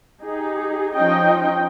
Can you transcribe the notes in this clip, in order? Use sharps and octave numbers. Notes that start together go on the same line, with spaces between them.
D#4 G4 G#4
F3 C#4 D#4 D#5 G5